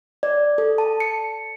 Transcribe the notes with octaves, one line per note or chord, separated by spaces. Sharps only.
D5
A4
A5
C#7